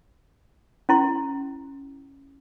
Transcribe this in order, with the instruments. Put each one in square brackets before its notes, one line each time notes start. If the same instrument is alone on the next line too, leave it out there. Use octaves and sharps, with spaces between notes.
[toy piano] C#4 E4 C6